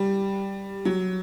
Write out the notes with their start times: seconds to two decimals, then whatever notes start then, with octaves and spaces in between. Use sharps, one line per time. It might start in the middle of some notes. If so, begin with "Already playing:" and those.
Already playing: G3
0.85 F#3